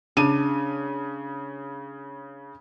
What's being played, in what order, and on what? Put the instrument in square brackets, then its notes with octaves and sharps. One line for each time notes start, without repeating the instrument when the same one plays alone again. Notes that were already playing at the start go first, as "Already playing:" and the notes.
[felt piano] C#3 D#7 [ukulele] D4